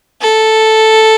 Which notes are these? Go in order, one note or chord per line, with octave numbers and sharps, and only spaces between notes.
A4